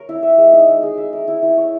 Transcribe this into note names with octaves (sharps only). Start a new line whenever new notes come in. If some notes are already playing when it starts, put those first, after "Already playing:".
Already playing: A#4 C#5
E4
E5
G#3
D#4
G#3
G#4
E5
A#4
E4
E4
C#5